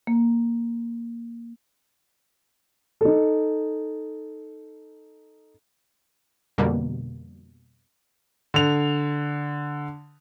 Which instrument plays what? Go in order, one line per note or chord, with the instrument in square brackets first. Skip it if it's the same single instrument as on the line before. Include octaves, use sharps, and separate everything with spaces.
[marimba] A#3
[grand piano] D#4 A4
[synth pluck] F2 B2 D3 G3 A#3
[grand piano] D3 F7